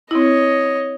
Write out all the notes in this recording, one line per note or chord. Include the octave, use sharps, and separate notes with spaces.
C4 E4 C#5 D#5